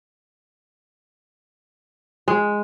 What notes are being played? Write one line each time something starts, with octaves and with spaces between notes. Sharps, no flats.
G#3